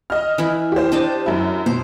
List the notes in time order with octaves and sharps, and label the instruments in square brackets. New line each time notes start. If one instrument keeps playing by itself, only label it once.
[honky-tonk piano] D#5 F6
[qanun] E3 E4
[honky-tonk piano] G4 C5
[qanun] D4 D#5 A5
[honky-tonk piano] F#2 E4
[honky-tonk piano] B2 [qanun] C5